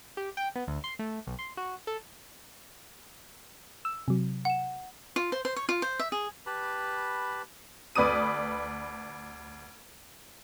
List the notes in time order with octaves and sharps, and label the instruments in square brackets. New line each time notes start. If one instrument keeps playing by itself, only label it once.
[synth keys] G4
G5
B3
D2
C6
A3
B1
C6
F#4
A4
[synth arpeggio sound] E6
C3 F#3
[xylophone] F#5 E7
[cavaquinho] F4
C5
C5
C#5
F4
C5
E5
G#4
[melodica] G4 B4 A5 B5
[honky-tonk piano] D2 B4 D5 D#6 D#7